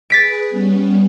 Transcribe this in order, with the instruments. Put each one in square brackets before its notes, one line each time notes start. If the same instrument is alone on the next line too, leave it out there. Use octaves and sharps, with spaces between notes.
[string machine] G#4 B4 [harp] A6 B6 D7
[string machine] G3 B3 C#4